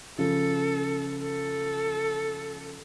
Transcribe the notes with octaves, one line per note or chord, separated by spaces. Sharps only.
C#3 F3 A4
A4